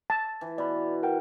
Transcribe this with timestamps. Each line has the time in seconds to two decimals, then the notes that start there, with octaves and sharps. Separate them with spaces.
0.10 A5
0.41 E3
0.58 B2 D5 B5
1.03 A#4 F#5 G5